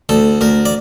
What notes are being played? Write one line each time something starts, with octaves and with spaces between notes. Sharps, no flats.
D2 A4
D2 A#4
D5